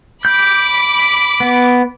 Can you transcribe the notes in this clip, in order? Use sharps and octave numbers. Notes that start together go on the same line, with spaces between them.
B5 D6 G6
B3